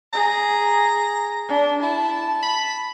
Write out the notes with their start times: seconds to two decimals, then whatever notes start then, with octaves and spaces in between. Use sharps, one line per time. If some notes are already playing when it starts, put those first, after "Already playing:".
0.13 G#4 A#5
1.49 D4
1.83 E4 A5
2.43 B5